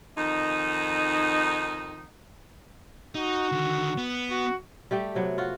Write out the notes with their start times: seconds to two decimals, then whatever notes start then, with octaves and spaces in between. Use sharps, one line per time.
0.17 F2 D#3 D#4
3.15 D#4 F#4
3.52 D3 D#3
3.97 B3
4.29 F#4
4.91 G3 A3 G4 G5
5.15 C3 F#3 B3
5.38 F4 F#4